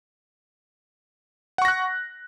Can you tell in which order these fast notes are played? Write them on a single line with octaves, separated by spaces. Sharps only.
F#5 C#6 A#6 F#6